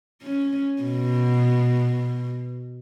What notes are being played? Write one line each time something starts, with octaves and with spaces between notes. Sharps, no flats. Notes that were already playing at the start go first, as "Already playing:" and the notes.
C#4
B2